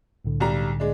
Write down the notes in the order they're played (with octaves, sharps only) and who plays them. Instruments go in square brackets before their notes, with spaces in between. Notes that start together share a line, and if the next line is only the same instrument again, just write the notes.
[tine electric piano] C2 A2 D3
[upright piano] B1 G3 A#5
G#3 D4